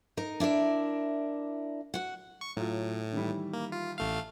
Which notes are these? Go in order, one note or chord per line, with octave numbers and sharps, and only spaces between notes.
D#4 A#4
D4 E4 A#4 D5
F#4 F#5
C#6
A2 F#3 F4
D#3 E3 G3
A#3
F4
A1 A3 F5